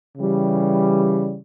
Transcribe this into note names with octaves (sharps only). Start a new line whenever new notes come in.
C#3 E3 G3